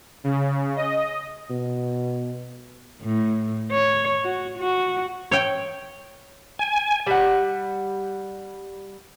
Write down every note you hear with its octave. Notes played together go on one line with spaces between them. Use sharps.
C#3
D#5
B2
A2
C#5
F#4
F#4
C#5 G5
G#5
G3 F#5